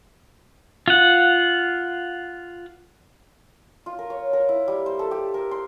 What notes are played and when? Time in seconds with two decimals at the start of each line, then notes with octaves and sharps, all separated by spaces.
0.88 F4 F#5
3.86 F4
3.99 A#4
4.10 C#5
4.33 A#4
4.49 E4
4.68 G3
4.86 C5
4.99 A4
5.11 G4
5.34 A#4
5.51 C6